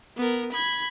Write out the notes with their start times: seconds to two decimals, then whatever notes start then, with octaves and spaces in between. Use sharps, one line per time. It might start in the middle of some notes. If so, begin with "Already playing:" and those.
0.17 B3 A#4
0.52 B5 G#6